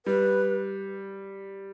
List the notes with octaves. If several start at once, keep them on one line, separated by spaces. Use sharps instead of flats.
G3 B4